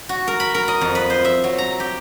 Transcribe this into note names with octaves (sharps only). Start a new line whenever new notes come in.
F#4
A#4
B5
A#4
D#5
F2
B4
C5
E5
F#3
A#5
G4